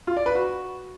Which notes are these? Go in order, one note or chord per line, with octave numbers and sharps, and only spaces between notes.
F4
D5
B4
F#4